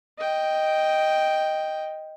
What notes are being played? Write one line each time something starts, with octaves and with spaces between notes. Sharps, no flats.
D#5 G5